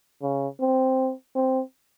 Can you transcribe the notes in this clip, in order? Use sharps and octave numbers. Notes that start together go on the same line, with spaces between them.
C#3
C4
C4